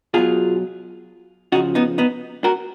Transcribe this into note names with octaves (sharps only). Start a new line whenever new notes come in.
B2 F#3 F4 G#4
C#3 F3 D#4 F#4
B3 D#4
B3 D#4
F#4 A#4